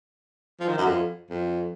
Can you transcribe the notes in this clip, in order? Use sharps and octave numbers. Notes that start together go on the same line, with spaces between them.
F3
D#3
F#2
F2
F2